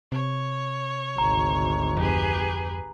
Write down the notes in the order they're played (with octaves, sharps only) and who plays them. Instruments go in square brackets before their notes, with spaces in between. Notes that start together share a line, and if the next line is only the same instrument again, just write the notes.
[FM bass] C3 [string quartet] C#5
[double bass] G#1 D2 [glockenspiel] A#5
[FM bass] F2 [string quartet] G4 G#4 B4